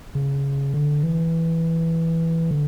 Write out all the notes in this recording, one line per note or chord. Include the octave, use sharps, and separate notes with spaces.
C#3
D3
E3
D3